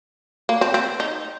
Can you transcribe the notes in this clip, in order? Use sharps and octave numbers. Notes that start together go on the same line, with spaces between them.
A#3
C4
C4
D#4